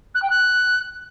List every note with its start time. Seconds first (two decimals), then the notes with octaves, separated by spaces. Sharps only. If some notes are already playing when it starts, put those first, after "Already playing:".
0.14 F#6
0.22 G5
0.30 F#6